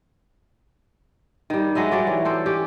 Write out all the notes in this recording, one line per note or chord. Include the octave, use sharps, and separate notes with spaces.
D#3 G3
F#3 G#3 D#5 E5
F#3 G3 C#5 D5
E3
A4 C5 D5
C#4 G4